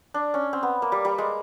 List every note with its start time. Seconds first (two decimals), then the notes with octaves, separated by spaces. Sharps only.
0.14 D4
0.34 C#4
0.53 C4
0.63 B3
0.82 A#3
0.92 G3
1.05 G3
1.18 G#3